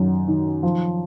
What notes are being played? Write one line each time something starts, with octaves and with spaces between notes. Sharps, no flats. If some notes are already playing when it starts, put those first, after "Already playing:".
Already playing: F#2 D#3
D#3
F3